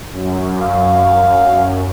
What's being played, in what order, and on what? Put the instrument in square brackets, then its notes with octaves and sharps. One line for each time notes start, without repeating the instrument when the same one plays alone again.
[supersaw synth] F#2
[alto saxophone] F5